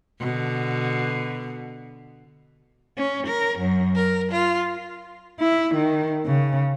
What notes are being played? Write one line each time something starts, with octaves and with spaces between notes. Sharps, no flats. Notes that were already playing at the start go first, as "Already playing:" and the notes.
B2 D3
C#4
A#4
F#2
A#4
F4
E4
D#3
C#3